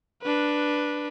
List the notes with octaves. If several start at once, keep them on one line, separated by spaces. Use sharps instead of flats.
D4 B4